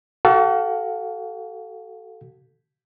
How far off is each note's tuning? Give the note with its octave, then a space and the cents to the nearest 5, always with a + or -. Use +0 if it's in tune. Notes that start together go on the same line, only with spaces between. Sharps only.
F#4 +40 A4 +0 F5 +15